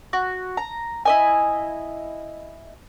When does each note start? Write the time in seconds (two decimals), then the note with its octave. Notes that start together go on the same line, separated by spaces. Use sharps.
0.13 F#4
0.57 A#5
1.05 E4 D#5 G#5